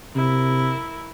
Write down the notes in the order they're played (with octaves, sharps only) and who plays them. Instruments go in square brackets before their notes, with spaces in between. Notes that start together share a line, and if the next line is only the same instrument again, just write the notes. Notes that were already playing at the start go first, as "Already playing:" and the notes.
[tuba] C3 [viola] E4 A#4